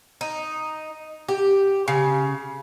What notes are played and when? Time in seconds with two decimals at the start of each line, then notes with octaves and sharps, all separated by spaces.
0.21 D#4
1.29 G4
1.88 C#3